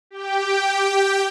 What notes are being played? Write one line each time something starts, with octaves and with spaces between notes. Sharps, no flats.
G4 G5